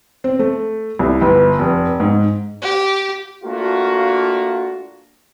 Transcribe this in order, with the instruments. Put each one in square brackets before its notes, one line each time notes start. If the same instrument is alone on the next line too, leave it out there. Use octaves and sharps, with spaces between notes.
[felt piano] C4
A3
C2
G1
F1
G#2
[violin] G4
[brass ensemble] A3 A#3 D4 F4 F#4